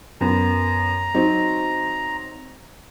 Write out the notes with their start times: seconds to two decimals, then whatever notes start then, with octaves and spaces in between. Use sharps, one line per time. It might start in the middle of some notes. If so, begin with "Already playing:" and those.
0.21 F#2 B3 A#5
1.14 F#3 C4 D#4